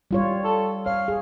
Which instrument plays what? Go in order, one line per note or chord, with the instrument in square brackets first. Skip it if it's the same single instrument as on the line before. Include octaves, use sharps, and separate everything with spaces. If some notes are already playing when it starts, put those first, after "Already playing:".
[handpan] G3 F4 C#5
[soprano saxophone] A4
[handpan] C#5 [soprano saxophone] F5
[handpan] G#4